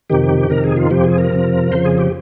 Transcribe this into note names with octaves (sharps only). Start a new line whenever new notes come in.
F2 C3 D#3 G4
F2 C3 D#3 A#4
G#4
F4
F2 C3 F3 G4
G#4
A#4
F2 C3 F3
F2 C#3 F3 C5
G#4
G4